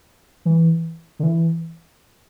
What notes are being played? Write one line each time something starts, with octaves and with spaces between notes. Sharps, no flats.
E3
D3
E3